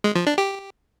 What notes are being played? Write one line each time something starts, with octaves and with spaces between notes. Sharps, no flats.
G#3
F3
D4
G4